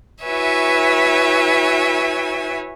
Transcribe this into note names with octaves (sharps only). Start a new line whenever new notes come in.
E4 F#4 B4 C#5 E5 G#5